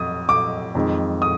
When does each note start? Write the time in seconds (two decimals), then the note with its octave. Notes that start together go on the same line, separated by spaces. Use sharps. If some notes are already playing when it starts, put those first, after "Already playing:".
Already playing: F2 D#6
0.29 D6
0.75 F2 D#3 G#3
1.22 D#6